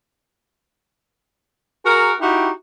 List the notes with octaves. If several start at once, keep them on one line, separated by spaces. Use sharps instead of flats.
F#4 G#4 A#4
D#4 E4 F#4 G4